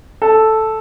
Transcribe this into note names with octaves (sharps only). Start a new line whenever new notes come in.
A4